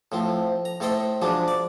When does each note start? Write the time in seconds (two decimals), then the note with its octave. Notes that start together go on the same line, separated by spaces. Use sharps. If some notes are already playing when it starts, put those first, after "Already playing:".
0.12 A2 F3 C4
0.65 A#5
0.80 A2 A3 A4 C5 D#5 G5
1.22 F3 F#3 G#3 D4
1.48 D5